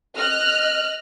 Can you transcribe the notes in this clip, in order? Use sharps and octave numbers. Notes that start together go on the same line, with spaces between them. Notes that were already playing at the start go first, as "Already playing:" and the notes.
D#5 F6 F#6